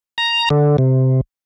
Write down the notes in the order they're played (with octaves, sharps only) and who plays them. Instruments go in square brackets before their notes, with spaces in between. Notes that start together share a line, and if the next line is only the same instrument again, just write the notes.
[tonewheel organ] A#5
D3
C3